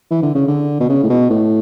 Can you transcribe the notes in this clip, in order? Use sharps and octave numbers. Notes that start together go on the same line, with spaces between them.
E3
D3
C#3
D3
B2
C#3
A2
B2
A2